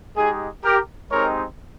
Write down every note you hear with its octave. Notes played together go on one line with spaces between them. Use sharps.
G#3 D#4 G4 G#4
G4 A#4
G#3 C4 D#4 G4 A#4 C#5